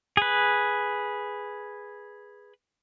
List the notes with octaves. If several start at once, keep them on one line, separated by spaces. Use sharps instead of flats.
G#4 B4